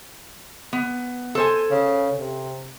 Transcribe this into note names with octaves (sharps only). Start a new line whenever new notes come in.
B3
A4 C5 G#5
C#3
C3